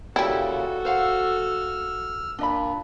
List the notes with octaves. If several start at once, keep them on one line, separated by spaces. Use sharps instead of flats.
A#2 C#3 G3 E4 F#4 A4 G5
C5 F5 F#5 E6 F6
A#2 D4 D#5 B5